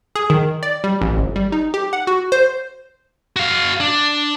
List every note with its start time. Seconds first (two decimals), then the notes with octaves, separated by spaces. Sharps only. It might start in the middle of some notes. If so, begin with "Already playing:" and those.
0.15 G#4
0.30 D#3
0.63 D5
0.84 G3
1.01 A1
1.17 G1
1.36 G3
1.52 D#4
1.74 G4
1.93 F#5
2.07 F#4
2.32 C5
3.36 F#4 F5
3.80 D4